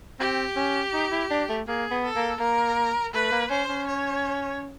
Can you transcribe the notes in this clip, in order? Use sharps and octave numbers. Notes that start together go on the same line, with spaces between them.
C4 G4
C#4
D#4
E4
D4
A3
A#3 G#4
B3
A4
A#3
A#3 A#4
A3 B4
A#3
C#4 C5
C#4
C#5